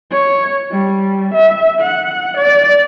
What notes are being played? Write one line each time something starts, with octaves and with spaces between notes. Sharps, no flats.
C#5
G3
E5
F#5
D5